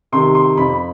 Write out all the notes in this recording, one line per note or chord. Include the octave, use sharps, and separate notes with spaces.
C3 D#3 C6
C6
F2 B5